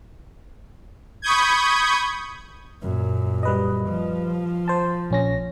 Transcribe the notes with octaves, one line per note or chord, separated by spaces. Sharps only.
B5 C#6 D#6 G6 G#6
F#2 A#2
G3 B4 D#5
F3
C5 A5
A#1 C#4 A#6